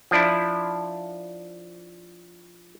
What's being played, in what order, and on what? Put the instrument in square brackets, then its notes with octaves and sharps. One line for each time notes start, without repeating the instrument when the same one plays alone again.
[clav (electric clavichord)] F3 D4 E4